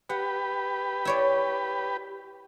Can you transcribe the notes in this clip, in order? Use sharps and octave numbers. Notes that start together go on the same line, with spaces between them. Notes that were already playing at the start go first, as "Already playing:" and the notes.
G4 B4 F#5
E4 C#5 D5